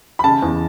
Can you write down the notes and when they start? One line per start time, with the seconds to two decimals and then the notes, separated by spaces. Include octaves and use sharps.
0.19 B5
0.24 C#3 A5
0.42 E2